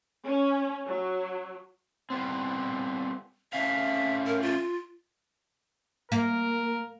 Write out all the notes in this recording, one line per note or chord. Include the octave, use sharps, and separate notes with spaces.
C#4
F#3
G3 B3 C4
A3 C#4 E5 F5
A#4
F4
A#3 A#4